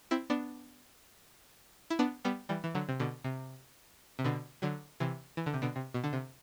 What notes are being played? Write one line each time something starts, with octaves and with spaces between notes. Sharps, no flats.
C4 E4
B3 D4
E4
B3 D4
G3 B3
E3 G3
E3
D3 F#3
C3
B2 D3
C3
C3
B2 D3
D3 F#3
C3 E3
E3
D3
C3
B2 D3
C3
B2
D3
C3